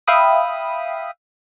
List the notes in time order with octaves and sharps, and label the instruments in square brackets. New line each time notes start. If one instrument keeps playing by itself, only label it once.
[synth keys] E5 F5 G5 B5 D#6